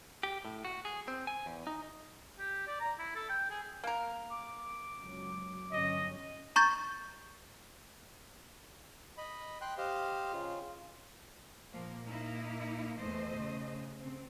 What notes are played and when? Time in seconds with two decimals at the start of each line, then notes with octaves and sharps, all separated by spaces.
0.23 G4
0.45 A2
0.65 F#4
0.85 G#4
1.08 C4
1.27 G#5
1.46 E2
1.67 D#4
2.39 G4
2.67 D5
2.80 A#5
2.99 E4
3.15 A4
3.29 G5
3.50 G#4
3.84 A#3 A#4
4.30 D6
4.98 F#1 C#2 F#3
5.72 G1 F#3 C#4 D#5
6.56 A#5 C#6 G6 A6
9.18 D#5 B5
9.61 G5 C6 F#6
9.78 G4 C5 D#5 F5
10.32 C#3 F4
11.73 A#2 F3 A#3
12.06 A#3 D#4 E4
12.98 E2 E3 A3 C5 D#5
13.37 C#3
13.96 C4